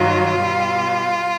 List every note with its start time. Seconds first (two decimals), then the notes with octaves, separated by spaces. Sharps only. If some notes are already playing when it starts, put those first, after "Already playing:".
Already playing: G2 D#3 F#3 F4
0.39 B2 G3